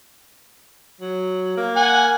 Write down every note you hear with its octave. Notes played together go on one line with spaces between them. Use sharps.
F#3
A#3
F#5 G#5